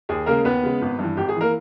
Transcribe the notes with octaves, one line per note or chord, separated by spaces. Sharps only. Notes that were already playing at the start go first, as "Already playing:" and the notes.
D#2 G#4
C#3 G#3 A#3 A#4
D#2 B3 B4
C#3 G#3
G#1
G2 E3
G#1 G4
G#4
E3
A#3 A#4